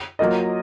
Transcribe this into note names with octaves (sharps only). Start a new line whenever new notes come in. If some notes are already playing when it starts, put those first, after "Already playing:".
F#3 A#3 F4 A#4 D#5